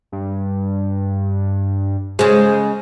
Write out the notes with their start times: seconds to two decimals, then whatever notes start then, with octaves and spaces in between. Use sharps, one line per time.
0.12 G2
2.19 C#3 G#3 C5